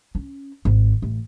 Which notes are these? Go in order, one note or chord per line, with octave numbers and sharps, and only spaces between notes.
C#4
G#1
A1